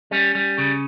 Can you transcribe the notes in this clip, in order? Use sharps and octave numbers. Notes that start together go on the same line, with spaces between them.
G3 C#4
G3
C#3